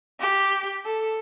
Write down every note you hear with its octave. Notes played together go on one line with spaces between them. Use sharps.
G4
A4